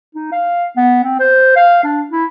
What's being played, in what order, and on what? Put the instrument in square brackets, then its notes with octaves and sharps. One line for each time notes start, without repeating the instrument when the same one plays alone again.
[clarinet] D#4
F5
B3
C4
C5
F5
D4
E4